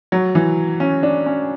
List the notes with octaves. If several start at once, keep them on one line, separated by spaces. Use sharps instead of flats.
F#3
E3
C#4
D4
C#4